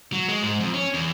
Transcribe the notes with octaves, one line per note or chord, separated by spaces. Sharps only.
F#3
G#3
G#2
F2
C#4
E2